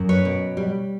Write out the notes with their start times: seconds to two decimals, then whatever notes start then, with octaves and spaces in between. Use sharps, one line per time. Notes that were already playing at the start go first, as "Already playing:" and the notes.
Already playing: F#2
0.09 B4 C#5
0.25 B2
0.57 G3